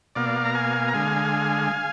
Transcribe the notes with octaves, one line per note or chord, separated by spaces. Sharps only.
B2 A#3 D5 F5
A#5
F5 G#5
A#5
D3 G#3 F5 G#5